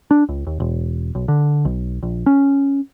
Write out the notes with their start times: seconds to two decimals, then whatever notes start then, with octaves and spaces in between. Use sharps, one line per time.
0.11 D4
0.29 C#2
0.47 D#2
0.60 E1
1.15 B1
1.28 D3
1.65 B1
2.03 A#1
2.26 C#4